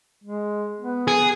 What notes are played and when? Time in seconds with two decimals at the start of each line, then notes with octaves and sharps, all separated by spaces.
0.24 G#3
0.81 B3
1.08 G#4